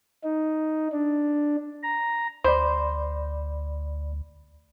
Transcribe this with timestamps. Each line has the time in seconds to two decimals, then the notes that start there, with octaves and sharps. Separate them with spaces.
0.24 D#4
0.92 D4
1.83 A#5
2.44 D2 C5 D5 B5